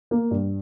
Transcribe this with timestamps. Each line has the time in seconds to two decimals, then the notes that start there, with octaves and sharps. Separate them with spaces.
0.11 A#3
0.31 G2